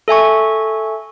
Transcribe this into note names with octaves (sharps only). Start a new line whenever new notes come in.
A4 E5 G#5 C#6